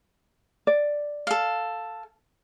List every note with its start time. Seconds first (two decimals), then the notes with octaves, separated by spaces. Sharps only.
0.67 D5
1.27 A4 F5